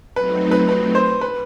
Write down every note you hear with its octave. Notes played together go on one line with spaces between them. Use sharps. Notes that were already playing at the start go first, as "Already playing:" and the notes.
F#3 A3 C4 D#4 B4
B4
B4
C5
B4